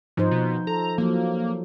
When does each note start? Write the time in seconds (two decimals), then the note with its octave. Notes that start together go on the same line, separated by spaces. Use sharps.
0.17 G#2 F3 D#4 C5
0.31 B2
0.67 A4 A#5
0.98 F3 F#3 A#3